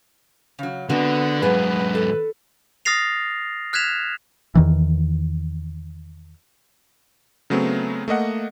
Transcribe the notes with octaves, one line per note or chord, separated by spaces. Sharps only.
C#3 F#3
D3 G#3 B3 C4 D4 F#4
G#2 F#3 A#3 B3 G#4 B4
A4
D#6 F6 A6 A#6 C7 F7
F6 F#6 G#6 B6 E7 F7
E2 D#3 E3
C#3 F#3 A3 B3 C4
A3 A#3 D#5 F#5